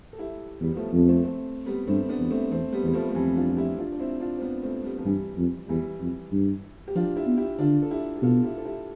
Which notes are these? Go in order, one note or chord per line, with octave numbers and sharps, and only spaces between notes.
A4
E4 G4
E2 G3 B3
B3
F3 A3
F2
A3 C4
A3 C4
G3 B3
G2 A3 C4
B3 D4
E2
A3 C4
E2 A3 C4
G3 B3
E2 G3
F3 A3
A3
F2 E3 G3
D4 F4
F4
E4 G4
D4 F4
D4
C4 E4
D4 F4
C4
B3 D4
A3 C4
G3 B3
F3
G2 E3 G3
F2
E2 E3 G3
F2
G2
G4
F3 D4 F4
E4 G4
B3
E4 G4
D3 D4 F4
A4
E4 G4
G4
B2 F4 A4
E4 G4
A4
E4 G4